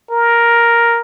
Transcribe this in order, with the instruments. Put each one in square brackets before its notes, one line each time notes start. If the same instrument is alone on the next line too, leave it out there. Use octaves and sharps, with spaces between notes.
[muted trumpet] A#4